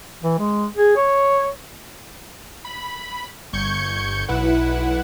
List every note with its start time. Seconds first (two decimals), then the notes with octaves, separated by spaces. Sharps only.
0.23 E3
0.39 G#3
0.77 G#4
0.97 C#5
2.65 B5
3.53 G1 C#6 G6 G#6 C#7
4.28 B1 E4 B4 F#5